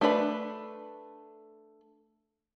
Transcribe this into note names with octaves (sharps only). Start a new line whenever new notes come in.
A3 D4 A4 B4 B5